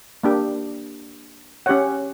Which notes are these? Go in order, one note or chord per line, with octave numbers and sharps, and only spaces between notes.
A#3 D4 G4
C#4 G4 C#5 F#5